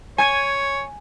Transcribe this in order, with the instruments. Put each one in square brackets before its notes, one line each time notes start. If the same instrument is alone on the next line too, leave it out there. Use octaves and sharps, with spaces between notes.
[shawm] C#5 [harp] G#5 G#6 D#7